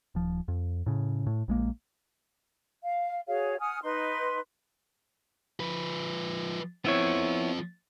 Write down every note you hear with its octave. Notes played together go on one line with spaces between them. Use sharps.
D#1 F3
F2
A2 C#3
A2
A#1 G#3 A#3
F5
F#4 G#4 C#5 F5
F#5 G#5 D#6 F6
D#4 B4 C6
F3 B4
F3 B3 C4 E4 C#5